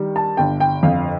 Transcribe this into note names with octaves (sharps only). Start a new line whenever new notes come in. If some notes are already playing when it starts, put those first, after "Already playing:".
Already playing: D#3 G3
A5
G1 G5
G5
F2 F5